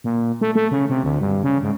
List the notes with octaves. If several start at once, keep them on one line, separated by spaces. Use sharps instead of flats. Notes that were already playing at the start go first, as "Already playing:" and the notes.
A#2
A3
A3
C#3
C3
D2
G2
C#3
G#2